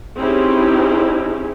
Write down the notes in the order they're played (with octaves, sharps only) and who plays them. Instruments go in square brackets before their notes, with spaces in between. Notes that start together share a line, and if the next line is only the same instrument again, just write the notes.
[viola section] C4 C#4 D#4 E4 G4 G#4